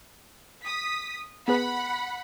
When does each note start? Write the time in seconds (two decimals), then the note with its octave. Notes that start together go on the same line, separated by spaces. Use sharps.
0.65 D#6 B6
1.48 B3 G#4 B4 F#5 B5